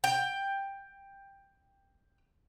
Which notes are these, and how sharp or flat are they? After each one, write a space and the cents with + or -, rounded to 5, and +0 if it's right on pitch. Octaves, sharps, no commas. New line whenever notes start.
G5 +10